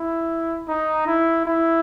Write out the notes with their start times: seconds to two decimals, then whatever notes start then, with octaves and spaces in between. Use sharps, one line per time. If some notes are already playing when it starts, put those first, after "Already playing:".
Already playing: E4
0.68 D#4
1.07 E4
1.45 E4